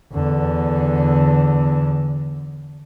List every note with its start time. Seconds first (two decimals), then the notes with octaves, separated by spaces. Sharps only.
0.13 E2 D3